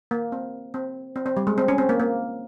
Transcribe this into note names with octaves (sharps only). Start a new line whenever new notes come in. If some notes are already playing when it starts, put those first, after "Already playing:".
A#3
C4
C4
C4
C4
G3
G#3
C4
C#4
C4
A#3
A#3